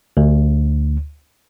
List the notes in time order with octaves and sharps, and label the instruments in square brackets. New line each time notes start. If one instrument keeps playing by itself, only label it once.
[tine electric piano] D2